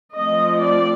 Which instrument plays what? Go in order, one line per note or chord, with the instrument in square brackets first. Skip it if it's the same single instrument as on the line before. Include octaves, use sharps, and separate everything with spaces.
[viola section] F3 A3 C4 D#5
D5